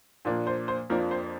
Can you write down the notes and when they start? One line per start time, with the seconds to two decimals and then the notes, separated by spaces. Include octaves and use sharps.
0.25 A#2 F3 A#3 D4
0.47 C5
0.68 C5
0.90 F2 F3 A#3 D4 A#4
1.11 C5